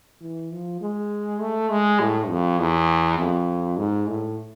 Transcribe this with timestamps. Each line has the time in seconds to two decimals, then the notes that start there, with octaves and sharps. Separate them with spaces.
0.21 E3
0.52 F3
0.81 G#3
1.40 A3
1.71 G#3
2.00 A2
2.29 F2
2.59 E2
3.18 F2
3.77 G#2
4.07 A2